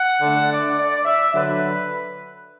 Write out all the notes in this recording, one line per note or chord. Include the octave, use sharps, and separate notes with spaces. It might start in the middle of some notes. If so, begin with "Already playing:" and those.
Already playing: F#5
D3 A3 D4
D5
D5
E5
D3 F#3 D4 B4